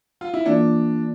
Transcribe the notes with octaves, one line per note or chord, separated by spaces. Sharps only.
F4
E4
E3 A#3 D4 F4 A4 D5